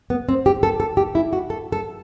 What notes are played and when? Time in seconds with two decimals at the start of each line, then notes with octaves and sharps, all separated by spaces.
0.10 B3
0.29 C4
0.46 G4
0.63 A4
0.80 A4
0.97 G4
1.15 E4
1.33 F#4
1.50 A4
1.72 A4